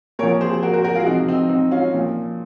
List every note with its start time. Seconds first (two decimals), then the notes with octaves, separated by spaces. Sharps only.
0.19 A#2 A#4 C#5
0.23 F3
0.41 G#4 C5
0.53 G#4
0.63 F#4 A#4
0.73 F#4 A#4
0.84 F#4 A#4
0.95 F4 G#4
1.06 C3 F3 D#4 F#4
1.28 C4 D#4
1.49 C4 D#4
1.71 C#4 F4
1.94 A#2 F3